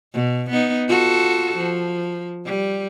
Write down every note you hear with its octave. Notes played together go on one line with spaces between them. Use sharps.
B2
B3 D#4
F4 F#4 A4
F3
G3